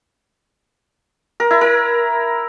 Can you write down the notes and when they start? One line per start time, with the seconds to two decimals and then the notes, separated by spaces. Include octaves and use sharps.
1.40 A#4
1.51 E4
1.61 A#4